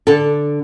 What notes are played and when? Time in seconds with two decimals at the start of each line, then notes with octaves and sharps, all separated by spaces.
0.07 D3 A4